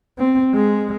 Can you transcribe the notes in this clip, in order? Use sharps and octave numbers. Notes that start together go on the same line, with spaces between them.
C4
G#3